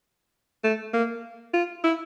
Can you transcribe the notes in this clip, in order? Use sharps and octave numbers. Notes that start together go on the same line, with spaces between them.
A3
A#3
F4
E4